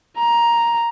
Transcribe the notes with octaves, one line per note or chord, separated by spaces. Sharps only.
A#5